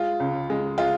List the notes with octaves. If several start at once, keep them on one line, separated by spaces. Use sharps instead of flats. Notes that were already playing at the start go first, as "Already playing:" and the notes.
Already playing: G#3 F4
C#2
G#3
G#3 F4